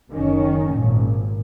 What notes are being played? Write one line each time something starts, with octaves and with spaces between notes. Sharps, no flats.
F#1 D#3 C#4
G#1 A#2